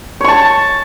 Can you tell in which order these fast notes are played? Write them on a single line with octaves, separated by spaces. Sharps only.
C#5 C#6 A5